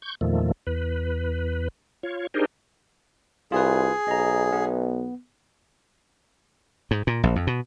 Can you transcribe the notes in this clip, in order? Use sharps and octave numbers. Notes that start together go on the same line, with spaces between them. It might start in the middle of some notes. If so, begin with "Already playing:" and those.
C#6 G6
E2 A#2 D#3 F3 A3
E2 B4
F4 C#5
D4 D#4 G4 G#4 A#4 C5
C2 F4 G#4 B4
B1 D#5 A#5
B3
G#2
A#2
A#1
F2
B2